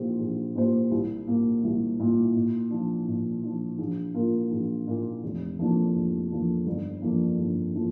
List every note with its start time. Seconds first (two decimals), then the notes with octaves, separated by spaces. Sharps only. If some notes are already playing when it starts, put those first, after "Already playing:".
Already playing: A#1 A#2 A#3 G4 C5
0.19 A#1
0.56 A#2 A#3 G4 C5
0.91 C2
1.28 A#2 A#3
1.64 C2
2.00 A#2 A#3
2.36 A#2
2.71 F3 D4
3.08 A#2
3.43 F3 D4
3.79 A#1
4.14 A#2 A#3 F4 A#4
4.52 A#1
4.86 A#2 A#3 F4 A#4
5.23 F1
5.59 F2 F3 A#3 D4
5.95 F1
6.31 F2 F3 A#3 D4
6.66 G1
7.02 F2 D3 F3 A#3
7.39 G1
7.75 D3 F3 A#3